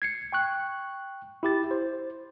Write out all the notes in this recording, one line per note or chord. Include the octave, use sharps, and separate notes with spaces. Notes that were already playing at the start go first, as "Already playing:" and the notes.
G#6 C7 C#7
G5 C#6 F#6
E4 G4 A6
C5